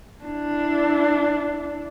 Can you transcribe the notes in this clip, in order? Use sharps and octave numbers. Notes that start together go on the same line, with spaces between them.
D4 E4